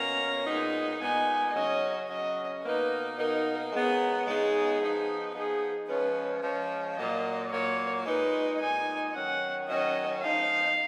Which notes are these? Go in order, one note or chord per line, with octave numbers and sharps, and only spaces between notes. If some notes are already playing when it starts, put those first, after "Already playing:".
Already playing: B2 A#3 C#4 A#5
A#2 G#3 B3 D#4
A#2 G#3 B3 D#4 G#5
C#3 F#3 C#4 D#5
C#3 F#3 C#4 D#5
B2 A#3 D#4 B4
B2 A#3 D#4 A#4
C#3 G#3 B3 D#4 G#4
C#3 G#3 B3 D#4 G#4
F3 B3 D#4
F3 B3 D#4 G#4
F3 G#3 C#4 B4
F3 G#3 C#4
A#2 F#3 A#3 D#5
A#2 F#3 A#3 C#5
A#2 G#3 D#4 B4
A#2 G#3 D#4 G#5
D#3 F#3 C#4 F#5
D#3 F#3 C#4 D#5
F3 G#3 D#4 F5